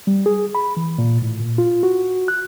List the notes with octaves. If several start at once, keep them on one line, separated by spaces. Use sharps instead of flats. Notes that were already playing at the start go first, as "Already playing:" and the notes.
G3
G#4
B5
E3
A#2
A2
A#2
F4
F#4
F#6